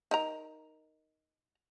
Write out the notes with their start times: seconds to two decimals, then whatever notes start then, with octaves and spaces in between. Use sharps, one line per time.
0.11 D#4 A#4 A#5